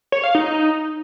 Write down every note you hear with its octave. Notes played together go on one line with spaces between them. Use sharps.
C#5
F5
D#4